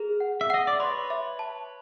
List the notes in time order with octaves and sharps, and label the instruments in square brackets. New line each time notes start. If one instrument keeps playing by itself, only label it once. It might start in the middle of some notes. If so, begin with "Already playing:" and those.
Already playing: [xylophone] G#4 [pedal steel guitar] A#4
[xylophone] F#5
[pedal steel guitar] E5
[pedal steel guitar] D#5 [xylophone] F#5
[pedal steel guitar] D5
[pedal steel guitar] B4 C#5 [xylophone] C6
[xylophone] E5
A5